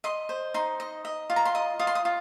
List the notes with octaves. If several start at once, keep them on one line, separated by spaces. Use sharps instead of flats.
D#5 C6
C5
D#4 C6
D#5
D#5
F4
A#5
C6
D#5 D#6
F4 D#6
C6
D#6
F4